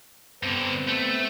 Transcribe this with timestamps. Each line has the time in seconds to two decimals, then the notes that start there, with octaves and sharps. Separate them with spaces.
0.43 G2 D3 B3 C4
0.88 A3